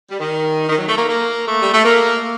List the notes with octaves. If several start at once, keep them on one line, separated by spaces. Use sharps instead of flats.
G3
D#3
D#3
F#3
A3
A#3
A#3
A3
G3
A3
A#3